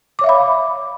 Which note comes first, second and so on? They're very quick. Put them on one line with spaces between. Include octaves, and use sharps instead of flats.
D6 C#5 E5 F5 B5